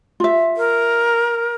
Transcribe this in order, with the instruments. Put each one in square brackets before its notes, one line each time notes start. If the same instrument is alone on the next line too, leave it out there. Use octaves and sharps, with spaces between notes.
[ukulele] F4 E5
[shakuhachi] A#4